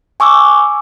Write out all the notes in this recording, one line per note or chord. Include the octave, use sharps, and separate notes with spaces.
G#5 C#6 D6 E6